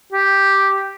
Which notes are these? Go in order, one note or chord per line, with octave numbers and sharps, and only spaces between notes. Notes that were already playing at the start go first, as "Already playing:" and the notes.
G4